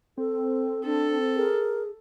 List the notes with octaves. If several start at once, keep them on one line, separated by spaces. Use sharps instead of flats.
C4 A4
D4 A4
G#4 A#4